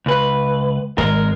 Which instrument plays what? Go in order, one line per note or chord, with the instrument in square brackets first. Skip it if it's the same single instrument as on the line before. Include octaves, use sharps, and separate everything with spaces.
[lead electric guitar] C#2 B4
[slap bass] G#1 G#3 [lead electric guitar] A#4